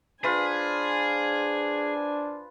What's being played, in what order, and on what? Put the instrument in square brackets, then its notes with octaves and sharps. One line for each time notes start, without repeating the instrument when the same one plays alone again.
[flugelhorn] D4 [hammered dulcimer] F4 B4 [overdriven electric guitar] G#4 [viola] C5 G#5